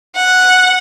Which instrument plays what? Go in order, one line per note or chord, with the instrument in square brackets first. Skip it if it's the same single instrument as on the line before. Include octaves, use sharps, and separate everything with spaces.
[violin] F#5